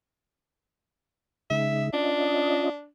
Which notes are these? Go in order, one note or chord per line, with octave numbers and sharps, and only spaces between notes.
C#3 G#3 D#4 E5
C#4 D4 F4 D#5